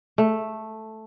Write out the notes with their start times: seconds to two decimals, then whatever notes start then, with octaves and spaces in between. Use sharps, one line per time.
0.18 A3